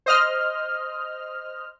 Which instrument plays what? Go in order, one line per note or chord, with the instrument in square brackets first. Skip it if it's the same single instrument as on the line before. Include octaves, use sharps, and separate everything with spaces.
[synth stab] C5 D#5 F6